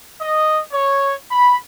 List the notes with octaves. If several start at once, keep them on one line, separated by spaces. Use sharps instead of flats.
D#5
C#5
B5